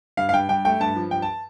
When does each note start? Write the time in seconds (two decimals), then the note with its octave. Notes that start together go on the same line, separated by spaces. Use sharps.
0.17 G2 F5
0.29 F5
0.33 G2 G5
0.49 G2 G5
0.65 A3 G5
0.80 G2 A5
0.96 F3
1.11 G2 G5
1.22 A5